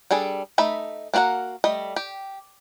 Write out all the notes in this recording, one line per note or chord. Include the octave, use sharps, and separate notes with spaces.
G3 D4 G#4 A4
A3 D#4 E5 B5
A#3 D4 F#4 A#4 F#5
G3 A3 D#5
G4